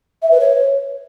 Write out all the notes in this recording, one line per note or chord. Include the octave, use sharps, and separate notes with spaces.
E5
B4
C#5